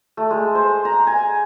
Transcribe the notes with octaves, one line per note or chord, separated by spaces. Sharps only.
A3
G#3
C5
A#5
G#5